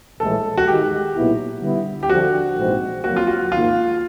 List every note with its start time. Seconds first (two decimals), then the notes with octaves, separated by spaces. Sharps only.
0.20 A#1 A2 E3 G#3 A4
0.58 F#4
0.67 G#2 D#3 G#3 G4
1.15 B1 A#2 F#3 B3 E4
1.62 D3 G3 B3 E4
2.03 G4
2.09 F2 D3 F3 F#4
2.57 A#1 G#2 E3 G#3 C4
3.04 F2 D3 F#3 A#3 F#4
3.16 F4
3.27 F#4
3.52 G#1 G#2 F3 A#3 F4